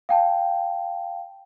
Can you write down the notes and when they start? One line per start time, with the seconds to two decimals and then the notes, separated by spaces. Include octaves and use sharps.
0.09 F5 G5 A5